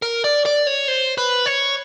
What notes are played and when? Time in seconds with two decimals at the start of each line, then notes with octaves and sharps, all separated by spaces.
0.02 A#4
0.24 D5
0.46 D5
0.67 C#5
0.88 C5
1.18 B4
1.46 C#5